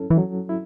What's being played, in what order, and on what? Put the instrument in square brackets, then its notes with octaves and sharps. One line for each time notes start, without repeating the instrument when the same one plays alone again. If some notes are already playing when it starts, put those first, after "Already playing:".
Already playing: [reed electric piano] F#3 C#4 E4 A4
[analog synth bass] E3
[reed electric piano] F#3
E4